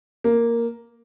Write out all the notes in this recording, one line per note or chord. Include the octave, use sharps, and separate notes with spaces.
A#3